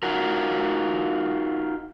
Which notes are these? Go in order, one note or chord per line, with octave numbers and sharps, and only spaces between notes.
D#4 F4 F#4 A#4